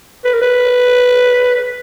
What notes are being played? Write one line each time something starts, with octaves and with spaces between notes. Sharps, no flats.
B4
A#4
B4